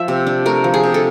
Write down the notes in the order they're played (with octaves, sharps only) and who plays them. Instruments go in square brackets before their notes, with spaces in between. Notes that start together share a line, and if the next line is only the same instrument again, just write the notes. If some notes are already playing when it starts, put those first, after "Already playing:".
Already playing: [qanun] F3 E5
C3
D4
A3 A#4
F3
G#4
C3
A4